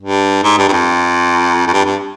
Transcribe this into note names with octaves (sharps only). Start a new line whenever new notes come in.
G2
G#2
G2
G2
F2
F2
G2
G2